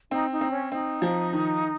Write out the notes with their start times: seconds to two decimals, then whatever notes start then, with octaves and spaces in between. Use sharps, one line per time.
0.11 C4 D#4
0.31 D#4
0.41 C4
0.51 C#4
0.72 C4 D#4
1.02 F3
1.33 D#3